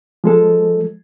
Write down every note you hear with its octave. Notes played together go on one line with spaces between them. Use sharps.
F3 G#3 A4